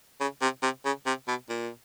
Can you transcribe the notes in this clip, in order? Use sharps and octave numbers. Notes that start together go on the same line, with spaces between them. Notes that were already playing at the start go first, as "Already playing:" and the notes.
C#3
C3
C3
C#3
C3
B2
A#2